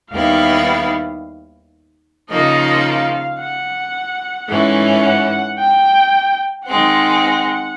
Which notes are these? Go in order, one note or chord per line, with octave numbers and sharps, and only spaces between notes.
D#2 D#3 G3 B3 E4 F5
C#3 F3 A#3 D#4 D#5
F5
F#5
G#2 E3 A3 C#4
F#5
G5
D#3 G#3 C4 F#5